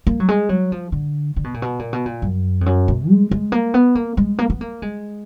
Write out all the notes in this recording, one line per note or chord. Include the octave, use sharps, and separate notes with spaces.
A#3
F#3
G#3
F#3
F3
D3
D3
B2
A#2
B2
A#2
B2
A#2
F#2
F2
F#2
B2
G#3
G#3
A#3
B3
A#3
G#3
A#3
B3
A#3
G#3